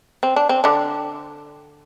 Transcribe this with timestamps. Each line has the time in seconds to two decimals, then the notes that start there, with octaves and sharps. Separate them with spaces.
0.23 C4
0.36 D4
0.49 C4
0.64 D3 D4